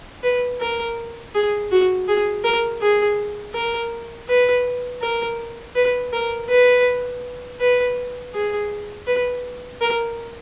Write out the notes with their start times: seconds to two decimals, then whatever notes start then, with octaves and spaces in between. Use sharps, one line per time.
0.23 B4
0.61 A#4
1.35 G#4
1.71 F#4
2.08 G#4
2.44 A#4
2.82 G#4
3.55 A#4
4.29 B4
5.02 A#4
5.76 B4
6.13 A#4
6.50 B4
7.60 B4
8.34 G#4
9.07 B4
9.81 A#4